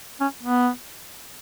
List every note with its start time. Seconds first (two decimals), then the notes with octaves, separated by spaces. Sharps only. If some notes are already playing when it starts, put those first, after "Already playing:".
0.20 C#4
0.43 B3